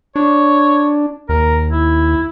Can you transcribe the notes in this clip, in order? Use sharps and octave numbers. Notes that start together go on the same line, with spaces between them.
D4 C#5
D#2 A#4
E4